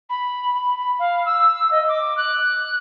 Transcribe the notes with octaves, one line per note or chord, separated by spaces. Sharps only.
B5
B5
B5
F5
E6
D#5
D6
F#6